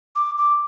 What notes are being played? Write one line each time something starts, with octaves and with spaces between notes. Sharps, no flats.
D6
D6